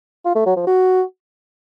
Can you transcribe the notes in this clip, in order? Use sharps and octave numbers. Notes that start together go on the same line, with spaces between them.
F4
A3
F#3
F3
F#4